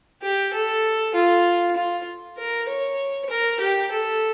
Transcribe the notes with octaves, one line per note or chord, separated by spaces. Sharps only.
G4
A4
F4
F4
A#4
C#5
A#4
G4
A4